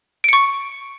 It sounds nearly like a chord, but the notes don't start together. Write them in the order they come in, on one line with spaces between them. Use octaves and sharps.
D7 C#7 C#6